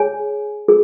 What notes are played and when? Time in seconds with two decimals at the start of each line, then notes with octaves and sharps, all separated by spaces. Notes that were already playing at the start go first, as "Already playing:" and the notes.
Already playing: G#4 C#5 G#5
0.68 G#4